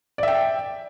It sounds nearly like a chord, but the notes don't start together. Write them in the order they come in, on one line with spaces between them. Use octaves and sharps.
D5 E5 G5